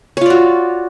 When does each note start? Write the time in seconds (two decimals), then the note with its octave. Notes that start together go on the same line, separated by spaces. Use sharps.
0.17 C#5
0.21 F4
0.26 D5
0.30 F#4